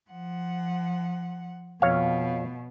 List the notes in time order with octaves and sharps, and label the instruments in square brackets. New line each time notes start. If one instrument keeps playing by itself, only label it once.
[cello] F3 F#5
[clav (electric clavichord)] F2 C#5 F5 [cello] B2